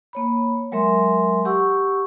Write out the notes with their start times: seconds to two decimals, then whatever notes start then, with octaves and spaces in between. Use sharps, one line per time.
0.13 A#3 C#5 B5
0.72 F#3 G#3 A#4 E5 C6
1.45 G4 F#5 C#6 E6